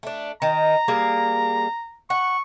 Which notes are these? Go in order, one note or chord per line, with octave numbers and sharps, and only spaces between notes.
A3 D4
D#3 A#5
G3 A#3 G#4
F#5 C#6